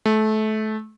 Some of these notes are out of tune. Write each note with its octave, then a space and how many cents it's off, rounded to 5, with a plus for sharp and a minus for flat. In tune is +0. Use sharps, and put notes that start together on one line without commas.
A3 -25